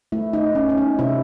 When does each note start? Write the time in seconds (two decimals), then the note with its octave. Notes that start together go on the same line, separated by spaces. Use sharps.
0.12 A3 E4
0.33 D#4
0.55 C#4
0.69 C#4
0.77 D#4
0.99 C3 E4